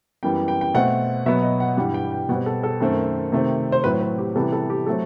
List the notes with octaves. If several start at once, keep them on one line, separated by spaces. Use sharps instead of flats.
F#2 E3 G3 B3 G5
G5
G5
B2 A3 C4 F#5
B2 F#3 B3 E5
D#5
F#5
G2 E3 G3 F#5
G5
G5
B2 G3 C4 F#5
A4
A4
F#2 D#3 A3 C4
C3 D#3 A3 C4
C5
A2 F#3 A3 C4 B4
B4
G4
C3 E3 G3 B3 A4
A4
G4
F#3 A3 C4 A4